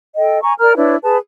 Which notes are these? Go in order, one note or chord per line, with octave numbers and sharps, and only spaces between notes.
A4 D#5 G5
G#5 A#5 C#6
A#4 D5 A#5 F6
D4 E4 B4 C#5
G#4 B4 A5